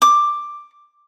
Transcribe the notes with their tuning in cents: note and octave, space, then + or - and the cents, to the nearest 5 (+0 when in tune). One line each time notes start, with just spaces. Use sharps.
D6 +5